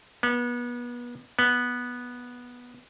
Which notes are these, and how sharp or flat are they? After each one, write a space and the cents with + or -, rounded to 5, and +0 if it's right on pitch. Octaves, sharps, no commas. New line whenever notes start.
B3 -30
B3 -10